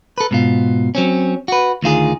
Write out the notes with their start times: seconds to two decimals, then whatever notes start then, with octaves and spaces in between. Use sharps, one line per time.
0.18 A4 B4
0.31 G#2 B2 F4
0.95 F#3 C4 C#4
1.48 F#4 B4
1.83 D2 D#3 F4 G#4